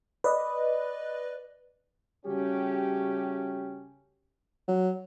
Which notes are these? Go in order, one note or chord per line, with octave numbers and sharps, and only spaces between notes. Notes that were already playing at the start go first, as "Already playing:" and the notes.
B4 D5 D#5
C#3 G3 A3 C#4 F#4 G4
F#3